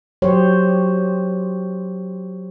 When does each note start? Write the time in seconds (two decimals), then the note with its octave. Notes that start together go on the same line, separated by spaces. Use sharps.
0.22 F#3 G4 C5 C#5